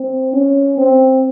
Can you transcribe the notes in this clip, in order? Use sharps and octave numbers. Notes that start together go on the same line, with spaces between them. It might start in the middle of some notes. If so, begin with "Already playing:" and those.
Already playing: C4
C#4
C4